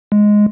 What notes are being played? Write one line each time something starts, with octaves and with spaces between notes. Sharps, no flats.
G#3